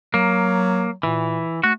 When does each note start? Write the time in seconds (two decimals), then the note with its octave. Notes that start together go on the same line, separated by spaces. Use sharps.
0.14 F#3 A#3
1.03 A#2 E3
1.64 A3 F#4